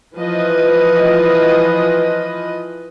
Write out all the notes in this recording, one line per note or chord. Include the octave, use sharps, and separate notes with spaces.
E3 F3 B4 D#5